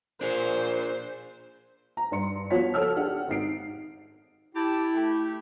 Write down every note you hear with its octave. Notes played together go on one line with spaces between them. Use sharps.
A#2 D4 G#4 C5
A#5
G2 D4 C6 C#7
F3 B3 F#4 C#5 B6
A4 C#5 A5 E6 F6
D4 G4 F#5
G#1 D#4 C7 D7
E4 G4 A5
A3 G4